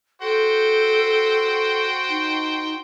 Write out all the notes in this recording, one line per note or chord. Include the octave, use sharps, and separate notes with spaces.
F#4 A4 C5 G5
D#4